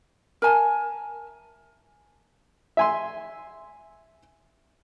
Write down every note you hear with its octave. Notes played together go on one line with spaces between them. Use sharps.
A#4 E5 G#5 A5
E5 G#5 C6